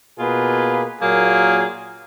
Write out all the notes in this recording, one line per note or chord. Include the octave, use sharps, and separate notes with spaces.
B2 A#3 F4 G#4 B4
A#2 F#3 A#3 F4 G#4